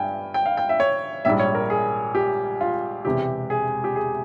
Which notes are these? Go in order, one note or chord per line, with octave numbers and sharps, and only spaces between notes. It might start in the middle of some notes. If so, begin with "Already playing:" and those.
Already playing: G2 G3 G5 G#5
G5
F5
G5
E5
C#5
A#1 G#2 G3 E5
C#5
A#4
G#4
G4
F4
E1 E2 C3 G4
G#4
G4
G#4